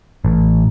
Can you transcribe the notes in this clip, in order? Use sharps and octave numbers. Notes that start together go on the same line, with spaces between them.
A1